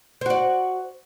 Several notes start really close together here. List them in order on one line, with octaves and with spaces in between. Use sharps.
C5 F#4 D5